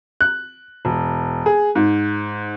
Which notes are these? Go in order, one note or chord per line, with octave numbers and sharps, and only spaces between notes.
F#6
E1
G#4
G#2